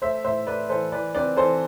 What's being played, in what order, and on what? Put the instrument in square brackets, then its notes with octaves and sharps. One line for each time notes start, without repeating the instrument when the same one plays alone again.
[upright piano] A3 C5 E5
A2 C5 E5
A3 B4 D5
E3 A4 C5
E3 B4 D5
C4 B4 D5
E3 A4 C5